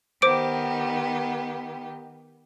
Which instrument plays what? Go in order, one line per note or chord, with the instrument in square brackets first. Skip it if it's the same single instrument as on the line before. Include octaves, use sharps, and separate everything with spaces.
[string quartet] D#3 B3 G4 [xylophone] C5 D6 D7